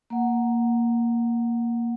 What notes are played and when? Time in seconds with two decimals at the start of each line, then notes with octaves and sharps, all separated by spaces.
0.10 A#3 F#5